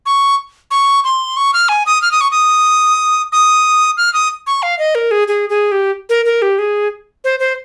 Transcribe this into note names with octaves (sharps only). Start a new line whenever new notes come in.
C#6
C#6
C6
C#6
F6
G#5
D#6
F6
D#6
C#6
D#6
D#6
F6
D#6
C#6
F5
D#5
A#4
G#4
G#4
G#4
G4
A#4
A#4
G4
G#4
C5
C5